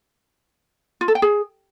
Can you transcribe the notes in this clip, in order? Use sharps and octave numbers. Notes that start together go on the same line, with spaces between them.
F4
A4
G5
G#4